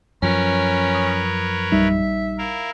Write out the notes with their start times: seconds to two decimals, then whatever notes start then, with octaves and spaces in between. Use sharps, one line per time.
0.22 F#2 F3 C#4 A#4 B4 C#5
0.90 C#6 D#6
1.72 A#1 G3 D#4 E5
2.38 E4 A#4 F5